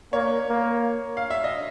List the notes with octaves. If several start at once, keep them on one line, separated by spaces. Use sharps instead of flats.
A#3 C#5
A#3
F5
E5
D#5